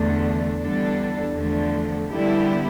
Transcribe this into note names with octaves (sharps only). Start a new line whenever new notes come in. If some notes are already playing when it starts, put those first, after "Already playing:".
Already playing: E2 D3 A3 D4
E2 D3 G3 D4 A4
E2 D3 F3 A3
D3 G3 B3 E4 G4